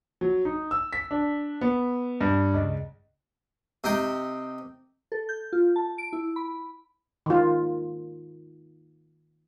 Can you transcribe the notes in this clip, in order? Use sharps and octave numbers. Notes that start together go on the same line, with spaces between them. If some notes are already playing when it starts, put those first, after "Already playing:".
F#3
D#4
E6
B6
D4
B3
G2
C#2
C3 D#4 G5
A4
G6
F4
A5
D7
E4
B5
D#3 F4